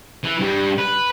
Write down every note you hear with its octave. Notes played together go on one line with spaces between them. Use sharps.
E3
G2 G3
B4